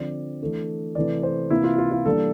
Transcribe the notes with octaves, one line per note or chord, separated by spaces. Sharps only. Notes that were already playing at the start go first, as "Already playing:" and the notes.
Already playing: D3 F3 C4 D5
E3 A3 D4
C3 E3 A3 D5
C5
C3 E3 A#3 E4
F4
F4
F4
E3 G3 A#3 D4 A4